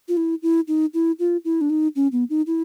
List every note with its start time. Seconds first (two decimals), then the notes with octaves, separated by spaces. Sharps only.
0.08 F4
0.17 E4
0.43 E4
0.68 D#4
0.94 E4
1.19 F4
1.45 E4
1.61 D4
1.70 D#4
1.96 C#4
2.12 B3
2.30 D#4
2.47 E4